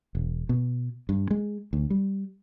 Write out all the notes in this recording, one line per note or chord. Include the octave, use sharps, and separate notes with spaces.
E1
B2
G2
G#3
D2
G3